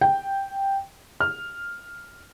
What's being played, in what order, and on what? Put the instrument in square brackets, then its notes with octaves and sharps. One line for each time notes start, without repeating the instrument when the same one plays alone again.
[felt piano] G5
F6